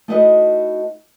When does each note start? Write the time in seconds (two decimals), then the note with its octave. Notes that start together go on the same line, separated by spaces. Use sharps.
0.08 A3 D#4 E4 F#4 B4 D#5